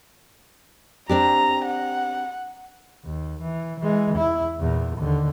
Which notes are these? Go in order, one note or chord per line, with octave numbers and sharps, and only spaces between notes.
C4 D4 G4 A#5
F#5
D#2
E3
E3 G#3
E2 E4
E2 A#2
D#2 D3